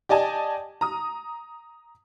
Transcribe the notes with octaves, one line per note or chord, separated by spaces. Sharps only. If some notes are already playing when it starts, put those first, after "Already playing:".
G4 D5 D#5 G#5 A5
A#5 D#6